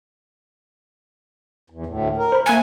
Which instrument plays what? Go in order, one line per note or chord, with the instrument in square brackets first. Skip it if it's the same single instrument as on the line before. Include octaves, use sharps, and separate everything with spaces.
[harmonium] E2
D2 A2
A#4
[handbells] C5 B5
[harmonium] A3 [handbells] A#3 F#6 C#7 [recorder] G#5